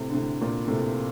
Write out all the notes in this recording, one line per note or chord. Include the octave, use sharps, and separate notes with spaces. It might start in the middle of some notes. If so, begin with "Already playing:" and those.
Already playing: A2 C3
D3
A2 C3
A#2
A2 C3